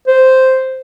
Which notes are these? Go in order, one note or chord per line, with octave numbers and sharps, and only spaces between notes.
C5